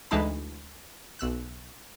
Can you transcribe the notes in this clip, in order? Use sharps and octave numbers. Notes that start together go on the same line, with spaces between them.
D2 E3 G#3 D#4 A5 B5
B1 E6 F#6